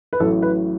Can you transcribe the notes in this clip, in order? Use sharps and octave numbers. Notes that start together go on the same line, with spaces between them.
B4
A1 A2 F#3 A4
B4